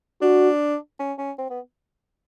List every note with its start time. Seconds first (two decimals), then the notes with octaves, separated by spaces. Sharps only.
0.22 D4 F#4
0.99 C#4
1.18 C#4
1.38 C4
1.50 B3